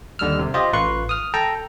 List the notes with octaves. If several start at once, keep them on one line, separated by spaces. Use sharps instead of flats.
D#2 D3 G3 E6 F6
C3
F4 G4 C5 D#5
A1 F4 B4 C6 C#6 F#6
D#6 F6
A4 G5 A5 A#5